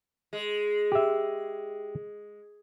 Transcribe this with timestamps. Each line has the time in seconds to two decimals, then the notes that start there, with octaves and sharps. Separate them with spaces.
0.33 G#3
0.92 G4 E5